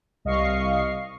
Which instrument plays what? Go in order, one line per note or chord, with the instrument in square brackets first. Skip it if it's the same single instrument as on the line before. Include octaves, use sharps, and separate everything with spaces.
[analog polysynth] C2 D#5 F5 C#6 C7